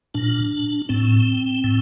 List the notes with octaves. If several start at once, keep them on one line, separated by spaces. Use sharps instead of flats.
A#2 D4
A2 C4
A2